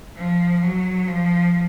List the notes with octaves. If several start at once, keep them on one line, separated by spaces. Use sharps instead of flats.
F3
F#3
F3